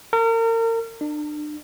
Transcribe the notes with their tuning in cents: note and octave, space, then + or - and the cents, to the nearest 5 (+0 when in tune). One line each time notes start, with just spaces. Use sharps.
A#4 -35
D4 +35